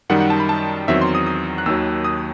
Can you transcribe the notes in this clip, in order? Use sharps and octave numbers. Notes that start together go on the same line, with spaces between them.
F#2 D#3 G3 D#4 F#5
F#5
A5
B5
A5
E2 D#3 F#3 C4 E5
C6
D#6
D#6
F#6
D#2 D#3 F#3 E6
D#6